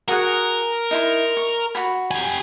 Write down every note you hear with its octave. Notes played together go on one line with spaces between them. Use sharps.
F#4 G#4 A#4 F#5
D#4 E4 C6
C#6
F#4 B5
G4 G#5